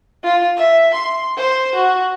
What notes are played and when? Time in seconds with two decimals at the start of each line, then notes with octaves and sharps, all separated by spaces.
0.23 F4
0.57 E5
0.94 C6
1.37 C5
1.75 F#4